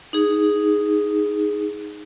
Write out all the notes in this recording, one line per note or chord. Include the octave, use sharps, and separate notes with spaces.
D#4 G#4